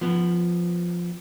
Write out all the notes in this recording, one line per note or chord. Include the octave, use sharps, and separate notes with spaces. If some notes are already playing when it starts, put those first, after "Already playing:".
F3 B3